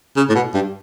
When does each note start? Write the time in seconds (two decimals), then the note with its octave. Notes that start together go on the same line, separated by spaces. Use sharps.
0.16 C#3
0.29 A2
0.35 B2
0.54 G2